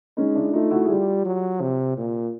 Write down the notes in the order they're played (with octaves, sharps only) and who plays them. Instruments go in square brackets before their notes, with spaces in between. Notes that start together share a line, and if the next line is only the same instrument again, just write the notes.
[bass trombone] G#3 [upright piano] C#4 D#4
[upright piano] D4 E4
[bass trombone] A3 [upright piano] D#4 F4
[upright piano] E4 F#4
G#4
[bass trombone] G3 [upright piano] F4 G4
[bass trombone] F#3
C3
A#2